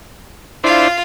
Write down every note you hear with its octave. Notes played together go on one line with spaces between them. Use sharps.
D4 E4 F4 C5 F5